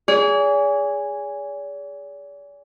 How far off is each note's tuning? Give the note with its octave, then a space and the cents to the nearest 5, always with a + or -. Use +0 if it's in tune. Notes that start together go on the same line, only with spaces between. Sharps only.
G#4 -10 D5 -45